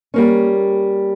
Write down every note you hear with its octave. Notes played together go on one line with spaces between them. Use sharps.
G3 A#3 C#4